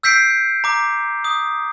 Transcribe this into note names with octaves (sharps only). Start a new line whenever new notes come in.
E6 G6 B6 C7 D7
A#5 D6
D#6